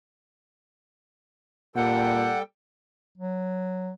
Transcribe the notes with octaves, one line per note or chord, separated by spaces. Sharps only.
A#2 G3 A4 F#5 G5
F#3